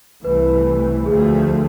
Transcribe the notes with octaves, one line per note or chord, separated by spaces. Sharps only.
C2 E3 A3 B4
D2 F3 A3 G#4